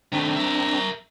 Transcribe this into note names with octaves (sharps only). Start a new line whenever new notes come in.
D#3 A3 C4 D4 A#5
A#4 E5